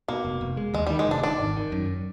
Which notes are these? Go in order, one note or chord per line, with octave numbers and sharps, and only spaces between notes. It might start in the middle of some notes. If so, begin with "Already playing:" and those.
B2 A#3
F1
F1
G#3
D#2 G#3
D#3 G3
G#3
F1 D4
D#3 D4
G#1
D#3
F#2